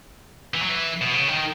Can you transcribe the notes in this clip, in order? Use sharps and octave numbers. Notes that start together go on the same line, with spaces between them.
E3
F#3
E3
B2
C#3
D#3